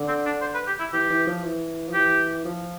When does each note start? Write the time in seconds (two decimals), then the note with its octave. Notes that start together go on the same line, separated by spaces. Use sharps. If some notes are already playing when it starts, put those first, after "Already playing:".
Already playing: D3
0.08 C4
0.26 D4
0.41 C5
0.55 B4
0.67 G4
0.79 E4
0.93 E3 G4
1.10 E3
1.27 F3
1.44 E3
1.89 F3
1.94 E3 G4
2.45 F3